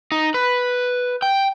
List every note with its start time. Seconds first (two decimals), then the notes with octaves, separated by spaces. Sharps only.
0.12 D#4
0.34 B4
1.22 G5